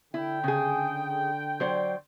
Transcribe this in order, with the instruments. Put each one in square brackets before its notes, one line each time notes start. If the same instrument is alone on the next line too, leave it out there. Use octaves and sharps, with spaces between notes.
[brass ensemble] D3 G5 [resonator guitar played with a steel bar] E4
[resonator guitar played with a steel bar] C#3 G#4
F#3 C5 D5